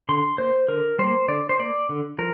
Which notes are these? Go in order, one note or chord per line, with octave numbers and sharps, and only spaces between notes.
D3 C6
A#3 C5
D3 A#4
G3 A#3 C5
D3 D5
C5
A#3 D5
D3
F3 A#4